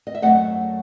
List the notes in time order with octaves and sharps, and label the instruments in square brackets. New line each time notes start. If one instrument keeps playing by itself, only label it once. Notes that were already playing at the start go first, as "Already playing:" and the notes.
[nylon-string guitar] D#5
E5
F#2 F#3 A3 D#5 F#5